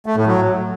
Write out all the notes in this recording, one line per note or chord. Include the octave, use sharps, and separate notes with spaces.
A3
A2
F#3